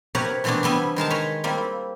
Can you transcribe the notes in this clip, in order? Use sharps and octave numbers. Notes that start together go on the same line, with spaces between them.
C3 G4 A#4 B4 C#5 F#5
B2 E3 A3 B3 C4 D4
C3 G3 B3 E5 G#5
D#3 G#3 A#4 A5
B4 C#5 A#5 C6
G3 A#3 C4 E4